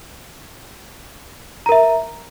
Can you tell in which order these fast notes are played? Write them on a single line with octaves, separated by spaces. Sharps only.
A#5 A#4 E5